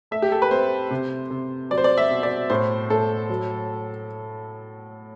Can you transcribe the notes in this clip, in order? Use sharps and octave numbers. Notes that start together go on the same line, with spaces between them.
A3 E5
G4
A4
B4
C4 C5
C3
C3
F#3 D5
C5
D5
E5
B2
D5
A2 C5
A2 A4
F#3